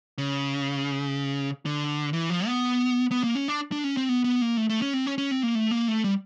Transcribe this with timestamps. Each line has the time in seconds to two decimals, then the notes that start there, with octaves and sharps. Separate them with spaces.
0.18 C#3
1.66 D3
2.13 E3
2.30 F3
2.47 B3
3.11 B3
3.24 A#3
3.35 C#4
3.48 D4
3.72 D4
3.84 C#4
3.97 C4
4.09 B3
4.24 B3
4.41 A#3
4.57 A3
4.69 A3
4.82 C#4
4.93 C4
5.06 C#4
5.18 C#4
5.31 C4
5.43 A#3
5.55 A3
5.71 A#3
5.88 A3
6.04 G3